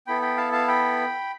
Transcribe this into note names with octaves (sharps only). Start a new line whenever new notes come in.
B3 E4 A4 G5 B5
G5 B5
F5 A5
F5 A5
G5 B5